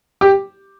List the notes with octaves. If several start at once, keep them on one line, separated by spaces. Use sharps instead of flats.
G4